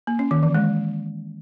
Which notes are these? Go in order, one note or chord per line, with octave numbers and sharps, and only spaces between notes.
A#3
C#4
D#3
E3
G#3